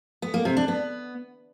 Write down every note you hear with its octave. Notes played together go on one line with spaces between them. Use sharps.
B3
A#3
C3
D4
B3